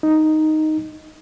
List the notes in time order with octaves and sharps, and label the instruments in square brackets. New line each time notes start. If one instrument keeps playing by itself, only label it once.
[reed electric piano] D#4